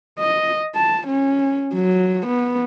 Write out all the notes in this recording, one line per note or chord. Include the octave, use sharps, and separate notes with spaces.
D#5
A5
C#4
F#3
B3